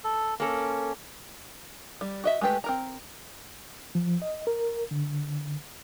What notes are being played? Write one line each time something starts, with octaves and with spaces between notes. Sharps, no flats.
A4
A#3 C#4 A4
G3
F#4 D#5 E5
G#3 A3 G4 B4
C4 A#4 A#5
F3
D#5
A#4
D3